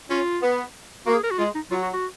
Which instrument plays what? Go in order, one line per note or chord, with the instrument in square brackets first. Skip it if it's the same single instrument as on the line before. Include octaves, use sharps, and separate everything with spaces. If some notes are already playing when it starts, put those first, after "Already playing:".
[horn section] C#4 [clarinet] F4
[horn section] B3
[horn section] A#3 [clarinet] F#4
[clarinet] G#4
A#4
F#4
[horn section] G#3 [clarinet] F4
[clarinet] D#4
[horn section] F#3 [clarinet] F4
[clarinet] F#4
F#4